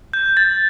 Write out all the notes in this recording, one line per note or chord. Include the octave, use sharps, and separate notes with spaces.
G6
A6